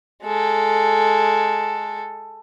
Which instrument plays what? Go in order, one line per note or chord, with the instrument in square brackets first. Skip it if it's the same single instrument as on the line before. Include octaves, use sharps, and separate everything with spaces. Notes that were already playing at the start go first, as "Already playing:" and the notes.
[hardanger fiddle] G#3 A4